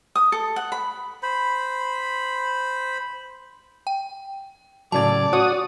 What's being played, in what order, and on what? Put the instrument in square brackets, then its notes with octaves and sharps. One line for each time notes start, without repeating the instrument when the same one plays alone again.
[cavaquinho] D#6
A4
F#5
B5
[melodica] C5 B5
[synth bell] G5
[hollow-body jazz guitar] A2 C#3 F#3 [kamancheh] D5 [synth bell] A5 G#6
[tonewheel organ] F#4 D#6 [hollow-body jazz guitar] C#5